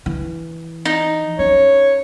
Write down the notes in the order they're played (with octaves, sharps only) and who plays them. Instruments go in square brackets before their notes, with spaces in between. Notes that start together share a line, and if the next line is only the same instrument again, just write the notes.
[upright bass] E3
[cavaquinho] D#4
[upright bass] C#4 [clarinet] C#5